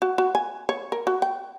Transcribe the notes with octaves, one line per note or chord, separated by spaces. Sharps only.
F#4
F#4
G#5
C#5
A#4
F#4
G5